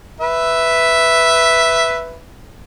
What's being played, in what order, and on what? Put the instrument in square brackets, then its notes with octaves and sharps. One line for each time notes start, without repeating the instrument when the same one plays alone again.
[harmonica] B4 E5